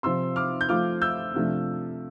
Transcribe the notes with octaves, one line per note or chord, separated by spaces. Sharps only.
C3 F3 C4 F4 C6 E6
D6 F6
G6
F3 A3 C4 F4 D6 F6
E6 G6
C3 F3 A3 D4